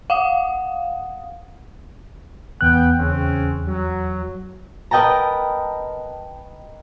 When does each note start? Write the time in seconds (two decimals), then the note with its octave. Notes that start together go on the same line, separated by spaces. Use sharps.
0.10 F5 F#5 D#6
2.61 E2 B3 G5 F#6
2.99 C#3 C4 C#4
3.68 F#3
4.91 A#4 B4 D#5 G5 A5 A#5